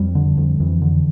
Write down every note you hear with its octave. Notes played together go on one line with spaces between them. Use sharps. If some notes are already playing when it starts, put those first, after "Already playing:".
Already playing: F2 G3
D3
F2
F2 E3
D3